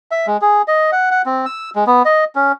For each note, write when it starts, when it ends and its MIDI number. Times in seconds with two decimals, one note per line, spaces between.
0.11 0.26 76
0.27 0.37 56
0.42 0.62 68
0.68 0.91 75
0.92 1.10 78
1.11 1.22 78
1.26 1.45 60
1.46 1.70 88
1.76 1.84 56
1.87 2.03 59
2.05 2.24 75
2.35 2.52 61